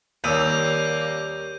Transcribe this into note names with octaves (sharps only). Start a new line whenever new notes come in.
D#2 G3 A#3 C#5 D#6 E6 G6 D#7